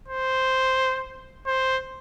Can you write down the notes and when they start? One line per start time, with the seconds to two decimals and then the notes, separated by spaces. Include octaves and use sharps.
0.08 C5
1.47 C5